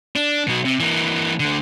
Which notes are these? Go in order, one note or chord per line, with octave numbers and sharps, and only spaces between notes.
D4
B2 F#3
C3
E3 A#3
D2 D3